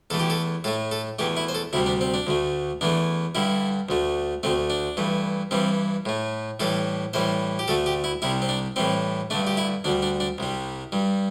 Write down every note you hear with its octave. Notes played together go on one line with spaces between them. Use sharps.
E2 E3 A3 A4
G4
A4
A2 A3 A4
A4
E2 E3 A3 G4
E4
C5
A4
D2 C3 G3 E4
D4
C4
D4
D2 D3 A3
E2 E3 A3 D4
G2 D3 G3 E4
D2 D3 A3
D2 D3 A3 C4
D4
G2 E3 A3
G2 E3 G3 C4
A2 A3
A2 E3 G3 A4
A2 E3 G3 C5
G4
D2 D3 A3 A4
G4
E4
C2 C3 G3 E4
C4
D4
A2 E3 G3 C4
G2 D3 A3 D4
G4
E4
D2 D3 G3 D4
D4
D4
C2 C3 G3
G2 G3